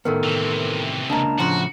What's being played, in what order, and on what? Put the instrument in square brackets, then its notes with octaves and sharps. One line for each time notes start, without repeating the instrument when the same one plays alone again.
[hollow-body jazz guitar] A2 D#3 B3 [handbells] A4 A#4
[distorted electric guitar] C3 E3
[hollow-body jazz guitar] C#2 A#3 [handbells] D4 A5 A#5
[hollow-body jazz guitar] A2 C#3 F3 [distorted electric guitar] F#4